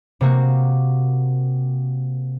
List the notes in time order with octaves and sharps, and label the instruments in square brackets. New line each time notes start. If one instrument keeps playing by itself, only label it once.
[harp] C3 A#3 F#4